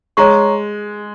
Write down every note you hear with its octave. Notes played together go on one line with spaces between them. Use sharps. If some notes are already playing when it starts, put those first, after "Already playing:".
G#3 C#5 A#5 C#6